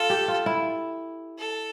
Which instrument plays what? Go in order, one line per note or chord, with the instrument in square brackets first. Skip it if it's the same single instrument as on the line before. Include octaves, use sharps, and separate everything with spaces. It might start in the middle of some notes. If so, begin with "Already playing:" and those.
Already playing: [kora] F4 [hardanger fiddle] A4
[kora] G4
F4
E4
[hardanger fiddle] A4